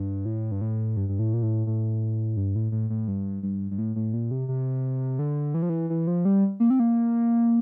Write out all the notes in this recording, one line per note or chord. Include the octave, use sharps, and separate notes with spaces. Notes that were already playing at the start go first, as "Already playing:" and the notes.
Already playing: G2
A2
G2
A2
G2
G2
A2
A#2
A2
A2
G2
A2
A2
A2
G2
G2
G2
A2
A2
A#2
C3
C3
D3
E3
F3
E3
E3
F3
G3
A#3
C4
A#3